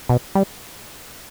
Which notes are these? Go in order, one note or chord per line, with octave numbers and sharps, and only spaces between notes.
B2
G3